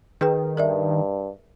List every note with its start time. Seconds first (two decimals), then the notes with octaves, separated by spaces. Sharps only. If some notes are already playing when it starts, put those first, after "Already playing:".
0.21 D#3 G#4 B4 G5
0.57 G2 A#4 D5 E5